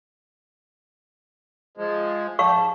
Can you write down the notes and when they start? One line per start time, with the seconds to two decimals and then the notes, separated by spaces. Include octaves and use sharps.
1.77 F3 G#3
2.39 G4 F5 A5 C#6
2.52 G#2